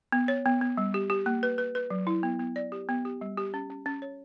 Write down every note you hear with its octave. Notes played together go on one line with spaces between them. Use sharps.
B3
C#5
B3
B3
G3
G4
G4
A#3
B4
B4
B4
F#3
E4
B3
B3
D5
G4
B3
G4
G3
G4
C#4
C#4
C#4
C#5